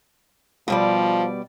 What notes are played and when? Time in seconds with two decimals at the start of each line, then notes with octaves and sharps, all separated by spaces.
0.68 B2 F3 G3 D5